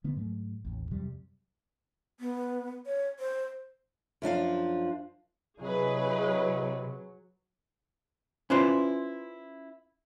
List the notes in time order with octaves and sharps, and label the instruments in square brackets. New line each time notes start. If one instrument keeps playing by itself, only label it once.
[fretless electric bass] D3 A#3 B3
G#2 F#3 A3
A1 D#2
F2 C3 F#3 G3
[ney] B3
C#5
C5
[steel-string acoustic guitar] F#2 F3 D4 F5
[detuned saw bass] C3 [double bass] F#3 [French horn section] E4 C#5 D#5 [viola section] G#4 B4
[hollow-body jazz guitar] C#4 E4 F4 B4 C5 D5